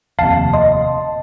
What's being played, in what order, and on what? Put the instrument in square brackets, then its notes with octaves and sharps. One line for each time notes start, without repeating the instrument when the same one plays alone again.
[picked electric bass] F1 D#2 C3 [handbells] F5 [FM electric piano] A5
[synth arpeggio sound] D#5 C6